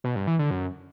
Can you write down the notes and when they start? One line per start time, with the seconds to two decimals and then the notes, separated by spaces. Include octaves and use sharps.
0.04 B2
0.16 G2
0.27 E3
0.39 D3
0.51 F#2